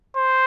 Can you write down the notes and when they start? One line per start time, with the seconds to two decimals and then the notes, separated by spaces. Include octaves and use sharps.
0.17 C5